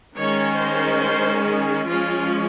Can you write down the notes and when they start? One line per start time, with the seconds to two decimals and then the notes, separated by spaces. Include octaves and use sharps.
0.16 D#3 G#3 C#4 C#5
0.59 C5
1.02 C5
1.44 G#4
1.87 F3 G#3 C#4 F4